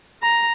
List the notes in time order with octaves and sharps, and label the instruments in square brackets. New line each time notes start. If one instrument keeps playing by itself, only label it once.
[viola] A#5